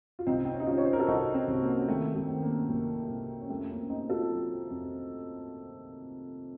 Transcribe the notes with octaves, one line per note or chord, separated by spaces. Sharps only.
F4
C2 C4 D#4
C4
C#4
D#4
C3 C#4 F4
C#5
C5
A#4
A4
C2 D#4 F#4
C4 D#4
C2
A#3 C#4
D#3 A3 C4
A3 C4
D#3
A#3 C#4
C2 A#3
C2
C#4
F2 A3 C4
A#3 C#4
C3 C4 D#4
F4 A4
F#3
F2